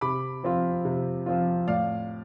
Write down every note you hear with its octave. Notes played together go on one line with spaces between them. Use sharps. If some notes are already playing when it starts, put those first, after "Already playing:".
C3 B5 D6
F3 C4 F4
C3
F3 C4 F4
A2 D5 F5